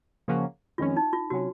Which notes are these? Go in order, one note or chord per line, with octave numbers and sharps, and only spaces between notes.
C#3 F3 A#3 C#4 F#4
F2 D#3 G#3 C#4 F4
D#4
F4
C3 F#3 C#4 F#4